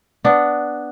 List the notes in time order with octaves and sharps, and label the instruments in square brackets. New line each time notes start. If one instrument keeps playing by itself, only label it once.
[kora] B3 D4